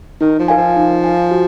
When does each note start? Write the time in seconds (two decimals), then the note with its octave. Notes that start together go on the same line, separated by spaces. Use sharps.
0.21 D#3 D#4
0.39 F3
0.48 A#4 F5 G#5
0.57 F3
0.76 D#4
1.04 A#4 F5 G#5
1.31 F#4